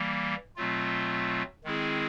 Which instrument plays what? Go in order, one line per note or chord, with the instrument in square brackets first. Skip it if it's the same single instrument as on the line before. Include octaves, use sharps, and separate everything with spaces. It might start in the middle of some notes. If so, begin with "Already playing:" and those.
Already playing: [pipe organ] E3 G3 A#3
B2 F#3 A3 C4 F4
D#3 G#3 C4 E4 G#4